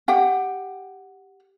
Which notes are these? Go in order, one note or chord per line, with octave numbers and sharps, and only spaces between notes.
G4 F#5 G5